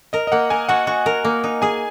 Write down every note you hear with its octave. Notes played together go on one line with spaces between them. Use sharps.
A#4 D#5
D#5
A#3 F#5
A#4 G#5
F#4 F#5
F#4
A#4
A#3
D#4
G#4 G#5